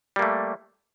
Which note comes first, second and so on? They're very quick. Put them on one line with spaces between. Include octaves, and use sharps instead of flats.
G3 A#3 A3